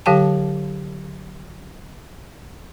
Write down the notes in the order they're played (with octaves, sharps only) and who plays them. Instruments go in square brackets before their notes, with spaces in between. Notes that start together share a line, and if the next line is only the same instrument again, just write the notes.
[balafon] D3 F#3 G4 F5 G5 A5